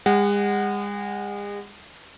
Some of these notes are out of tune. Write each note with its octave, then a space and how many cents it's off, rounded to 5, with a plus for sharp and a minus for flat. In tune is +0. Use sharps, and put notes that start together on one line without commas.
G#3 -40 F#5 +10